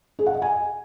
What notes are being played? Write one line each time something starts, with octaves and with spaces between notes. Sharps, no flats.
G#4
F#5
D#5
G#5